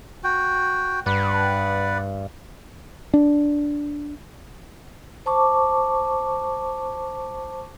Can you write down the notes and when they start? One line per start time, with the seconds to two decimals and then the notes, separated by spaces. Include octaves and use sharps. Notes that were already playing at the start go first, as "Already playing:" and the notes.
0.24 F#4 G5
1.06 G2 B4 D5 F#5
3.14 D4
5.26 C5 A5 C#6 D6